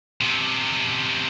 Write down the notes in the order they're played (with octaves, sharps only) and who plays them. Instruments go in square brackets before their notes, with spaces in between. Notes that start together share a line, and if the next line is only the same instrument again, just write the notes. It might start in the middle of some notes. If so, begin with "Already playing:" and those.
[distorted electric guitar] C3 B3